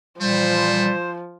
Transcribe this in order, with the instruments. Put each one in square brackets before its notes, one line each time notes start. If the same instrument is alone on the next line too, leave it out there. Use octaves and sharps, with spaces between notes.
[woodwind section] A#2 E3 G3 [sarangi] F3 [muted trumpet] A3 [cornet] C5